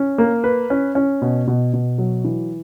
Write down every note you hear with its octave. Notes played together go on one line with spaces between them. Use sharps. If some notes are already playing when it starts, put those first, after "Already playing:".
Already playing: C#4
A#3
B4
C#4
C#4
B2
B2
B2
F#3
E3